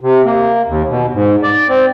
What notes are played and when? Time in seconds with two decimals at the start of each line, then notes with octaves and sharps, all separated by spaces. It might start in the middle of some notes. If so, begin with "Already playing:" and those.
0.01 C3
0.25 A#3
0.68 D#2
0.89 B2
1.14 G#2
1.43 D5
1.69 C4